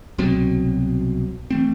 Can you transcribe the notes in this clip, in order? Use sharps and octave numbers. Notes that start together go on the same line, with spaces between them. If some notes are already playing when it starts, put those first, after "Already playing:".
C2 B2 F#3 C4
E3 A3 C4